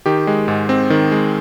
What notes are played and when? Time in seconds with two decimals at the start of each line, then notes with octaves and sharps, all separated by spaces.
0.06 D#3 G4
0.27 G#3
0.48 G#2
0.69 C4
0.90 D#3
1.12 G#3